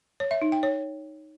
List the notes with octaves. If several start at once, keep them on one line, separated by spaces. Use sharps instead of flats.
C#5
E5
D#4
G5
C#5